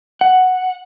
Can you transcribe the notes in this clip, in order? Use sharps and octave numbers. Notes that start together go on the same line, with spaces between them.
F#5